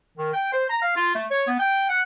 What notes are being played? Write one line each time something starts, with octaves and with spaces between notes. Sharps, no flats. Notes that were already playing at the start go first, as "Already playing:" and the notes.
D#3
G5
C5
A#5
F5
F4
A3
C#5
B3
G5
F#5